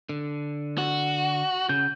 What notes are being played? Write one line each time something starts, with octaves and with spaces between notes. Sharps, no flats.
D3
F#4 F#5
C#3 G6